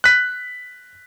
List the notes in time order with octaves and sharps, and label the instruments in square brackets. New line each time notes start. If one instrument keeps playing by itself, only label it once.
[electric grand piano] F#6 B6